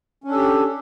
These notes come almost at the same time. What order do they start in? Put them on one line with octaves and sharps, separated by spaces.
C#4 D4 A4 G4